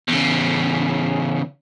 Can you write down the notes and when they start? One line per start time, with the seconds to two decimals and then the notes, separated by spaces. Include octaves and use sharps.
0.09 E2 C#3